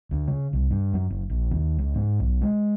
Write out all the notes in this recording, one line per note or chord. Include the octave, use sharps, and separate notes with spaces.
D2
C#3
C2
G2
F#2
F#1
A#1
D#2
C#2
G#2
B1
G#3